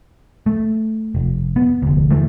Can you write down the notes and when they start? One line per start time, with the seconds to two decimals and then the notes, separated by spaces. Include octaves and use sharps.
0.46 A3
1.15 F1
1.56 B3
1.82 F1 D2
2.11 D2 E3 A3